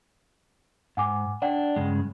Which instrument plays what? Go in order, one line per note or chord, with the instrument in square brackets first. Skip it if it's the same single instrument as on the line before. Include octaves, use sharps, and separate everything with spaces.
[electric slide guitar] G#2 [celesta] F#5 G#5 D6
[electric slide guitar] D4 [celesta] D5 F#5 G5
[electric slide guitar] G2 C#3 G#3